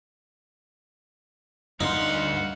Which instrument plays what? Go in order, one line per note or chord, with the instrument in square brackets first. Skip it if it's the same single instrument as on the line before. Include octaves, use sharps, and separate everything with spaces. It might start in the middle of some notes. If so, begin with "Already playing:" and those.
[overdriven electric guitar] D2 C6 [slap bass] G2 [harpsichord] D#4 [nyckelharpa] F5 F#5